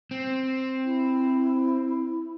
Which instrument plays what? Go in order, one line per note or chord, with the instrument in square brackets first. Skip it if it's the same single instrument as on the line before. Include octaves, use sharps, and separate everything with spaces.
[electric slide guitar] C4
[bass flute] E4